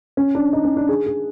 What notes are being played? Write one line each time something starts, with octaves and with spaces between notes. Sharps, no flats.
C#4
D4
D#4
C#4
D4
G#4
G#4